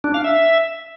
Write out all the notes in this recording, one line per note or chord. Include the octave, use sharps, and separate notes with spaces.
D4
F5
E5